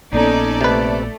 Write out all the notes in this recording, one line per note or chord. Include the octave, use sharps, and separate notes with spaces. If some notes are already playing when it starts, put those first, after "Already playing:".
A#1 A#3 B3 C#4 D#4 A4 D5
C3 A3 B4